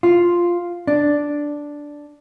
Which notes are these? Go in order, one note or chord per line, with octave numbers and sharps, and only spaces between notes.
F4
D4